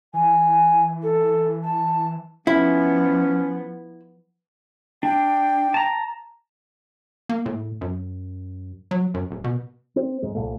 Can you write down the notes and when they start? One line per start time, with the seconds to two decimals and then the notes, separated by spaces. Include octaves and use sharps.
0.13 E3 G#5
1.02 A4
1.63 A5
2.47 F3 B3 C#4 E4
5.03 D4 G5
5.74 A5 A#5
7.29 A#3
7.46 A2
7.81 F#2
8.91 F#3
9.14 F#2
9.31 D#1
9.44 B2
9.96 C4
10.22 G#2 G#3
10.35 C2 A#2 A3